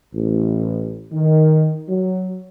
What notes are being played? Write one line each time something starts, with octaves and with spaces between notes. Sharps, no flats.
A1
D#3
F#3